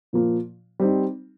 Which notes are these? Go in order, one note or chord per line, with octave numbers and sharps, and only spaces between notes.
A#2 F3 A#3
G3 C4 D#4